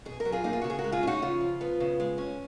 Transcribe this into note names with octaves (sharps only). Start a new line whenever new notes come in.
B2 G#4
A#4
F#3
F4 G#4
A#3 D#4
F4
C#3 F#4
G#4
F#4 A#4
G#3
F4 G#4
C#4 D#4 F#4
C#3 F4
F3
B3
C#3
G#3
C#4